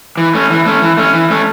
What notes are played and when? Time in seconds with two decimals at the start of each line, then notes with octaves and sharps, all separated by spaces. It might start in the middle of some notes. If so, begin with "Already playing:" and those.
0.17 E3
0.34 A3 C#4
0.50 E3
0.66 A3 C#4
0.82 E3
0.97 A3 C#4
1.13 E3
1.30 A3 C#4